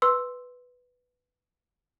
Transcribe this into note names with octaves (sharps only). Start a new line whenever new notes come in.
B4 C6 E6